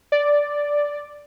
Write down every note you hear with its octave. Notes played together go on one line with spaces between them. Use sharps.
D5